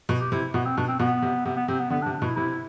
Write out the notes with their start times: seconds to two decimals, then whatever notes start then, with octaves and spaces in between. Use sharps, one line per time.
0.09 B2
0.20 G4
0.32 C3 E4
0.54 B2 B3
0.65 C4
0.77 B2 D4
0.89 C4
1.00 B2 B3
1.22 C3
1.45 C3 B3
1.57 B3
1.68 C3 C4
1.80 B3
1.90 D3 B3
2.02 D4
2.06 C3
2.14 D4
2.22 B2
2.25 E4
2.36 C3 E4